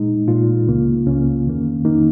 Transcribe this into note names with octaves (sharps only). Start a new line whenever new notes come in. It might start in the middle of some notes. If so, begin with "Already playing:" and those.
Already playing: A#2 G#3 D#4
A#2 G#3 F4
C#2 C#3 A#3
C#2 C#3 A#3 C#4
F2 D#3 A#3
F2 D#3 A#3 D#4